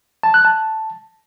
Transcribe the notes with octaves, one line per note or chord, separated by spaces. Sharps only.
A5
F#6
A5